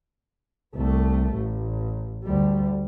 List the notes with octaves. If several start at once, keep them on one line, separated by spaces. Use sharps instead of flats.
C2 A3
A1
D2 G3